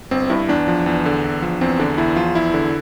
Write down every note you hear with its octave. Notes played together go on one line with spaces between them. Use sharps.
G1 C4
G2 E4
E2 D4
F3
E2
D3
E2
F3
E2 C4
D3 D4
E2 E4
F3 F4
E2 E4
D3